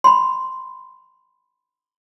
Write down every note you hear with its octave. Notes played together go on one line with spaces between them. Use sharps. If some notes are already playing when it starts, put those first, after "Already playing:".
B5 C6